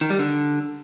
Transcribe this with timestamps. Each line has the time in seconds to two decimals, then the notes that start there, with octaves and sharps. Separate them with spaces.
0.01 D#3
0.10 G3
0.19 D3